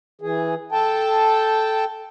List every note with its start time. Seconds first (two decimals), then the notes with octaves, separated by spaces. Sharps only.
0.21 E3 G#4
0.72 A4 G5 A5